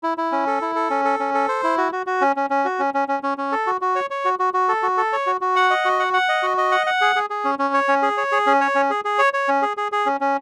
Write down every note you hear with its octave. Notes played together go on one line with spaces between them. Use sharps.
E4
E4
C#4
A4
E4
A4
C#4
A4
C#4
A4
C5
E4
F#4
F#4
F#4
C#4
C#4
C#4
F#4
C#4
C#4
C#4
C#4
C#4
A4
F#4
F#4
C#5
C#5
F#4
F#4
F#4
A4
F#4
A4
C#5
F#4
F#4
F#5
D#5
F#4
F#5
F#5
D#5
F#4
D#5
F#5
F#5
G#4
G#4
G#4
C#4
C#4
C#5
C#4
G#4
C#5
G#4
C#4
C#5
C#4
G#4
G#4
C#5
C#5
C#4
G#4
G#4
G#4
C#4
C#4